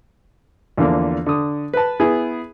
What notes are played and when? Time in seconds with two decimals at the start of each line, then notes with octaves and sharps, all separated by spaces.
0.78 E2 D3 F3 A#3
1.26 D3 D#6
1.73 B4 A5
2.00 B3 E4 G#4 G#5